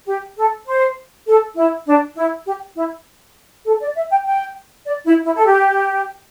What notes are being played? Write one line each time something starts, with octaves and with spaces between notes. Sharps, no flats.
G4
A4
C5
A4
E4
D4
E4
G4
E4
A4
D5
E5
G5
G5
D5
E4
E4
A4
G4